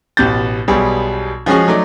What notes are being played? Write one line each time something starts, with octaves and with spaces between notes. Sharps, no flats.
A1 B2 G4 G6 A6
B1 G3 B3 G#4
F3 G#3 C#4 F#4 G#4
F#3 A3 D#4 D5